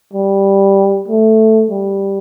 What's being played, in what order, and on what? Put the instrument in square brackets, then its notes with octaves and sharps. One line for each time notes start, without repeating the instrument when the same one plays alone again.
[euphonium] G3
A3
G3